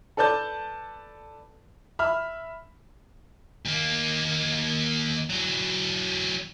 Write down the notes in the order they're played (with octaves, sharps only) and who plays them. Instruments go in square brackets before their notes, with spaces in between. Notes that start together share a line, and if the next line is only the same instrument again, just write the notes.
[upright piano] A4 B4 D5 A5 G6
E5 B5 F6
[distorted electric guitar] D#2 A#3
E3 F#3